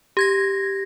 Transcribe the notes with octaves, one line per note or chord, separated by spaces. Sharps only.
G4 G#6 A#6